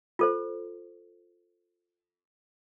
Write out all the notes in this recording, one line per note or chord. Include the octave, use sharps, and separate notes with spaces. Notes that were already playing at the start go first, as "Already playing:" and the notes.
F4 A4 C5